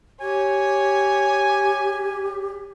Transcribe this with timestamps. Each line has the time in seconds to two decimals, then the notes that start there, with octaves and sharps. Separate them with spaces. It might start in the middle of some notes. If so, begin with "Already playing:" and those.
0.21 G4 C#5 G#5